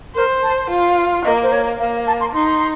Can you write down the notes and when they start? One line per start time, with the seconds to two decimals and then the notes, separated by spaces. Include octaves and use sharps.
0.15 A#4 C5
0.43 A5
0.70 F4
0.97 F5
1.24 A#3 D#5
1.43 C5
1.52 C#5
1.80 A#3 F5
2.07 A5
2.21 C6
2.34 D#4 C6